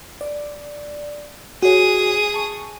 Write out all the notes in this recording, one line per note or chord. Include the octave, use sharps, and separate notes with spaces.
D5
F#4 G#4 C#5 D#6
A5 C#6